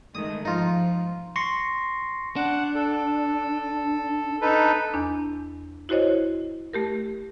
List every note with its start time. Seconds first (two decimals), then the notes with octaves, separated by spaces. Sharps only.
0.15 D#3 G#3 A3 D#6
0.45 G#2 F3 D#4 F4
1.36 C6 C#6 A#6 C7 C#7
2.36 D4 F#5
2.75 A4
4.41 D#4 A4 B4
4.94 E2 D4
5.89 E4 F#4 C5 C#5 D#5
6.73 A3 G4 A#4